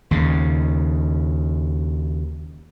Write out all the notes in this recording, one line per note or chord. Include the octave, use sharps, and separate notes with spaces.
D#2 C#3